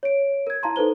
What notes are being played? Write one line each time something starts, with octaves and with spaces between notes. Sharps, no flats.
C#5 D7
A#4 G#6
E4 F5 A5 A#5 C6
D#4 A4 B4 C5 G7